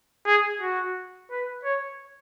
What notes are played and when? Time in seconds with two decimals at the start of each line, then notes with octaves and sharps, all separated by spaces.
0.26 G#4
0.61 F#4
1.31 B4
1.65 C#5